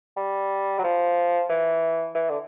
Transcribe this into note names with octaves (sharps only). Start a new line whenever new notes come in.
G3
F#3
F3
E3
E3
D3